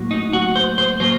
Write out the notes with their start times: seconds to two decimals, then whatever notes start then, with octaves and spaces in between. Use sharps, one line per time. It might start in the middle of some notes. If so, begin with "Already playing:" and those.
Already playing: A2 F#3 A#3
0.11 D#4
0.33 F#4
0.56 C5
0.78 C5
1.00 F#3 A#3 C5